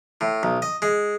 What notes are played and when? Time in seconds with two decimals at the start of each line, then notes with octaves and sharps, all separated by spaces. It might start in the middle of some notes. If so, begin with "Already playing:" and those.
0.21 A2
0.43 B1
0.62 D#5
0.82 G#3